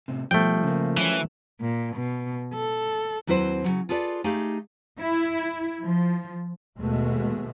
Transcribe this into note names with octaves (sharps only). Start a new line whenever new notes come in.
A2 C3
B2 F3 G3 A3 G5
C#3 A#3
E3 F#3 C#4
A#2
B2
A4
D#2 F#3 C4 E4 B4 C5
C#3 F#3
F4 G#4 A4 B4 D5
A3 D#4 G4 G#4 F5
E4
F3
D#2 B2 G#3 A3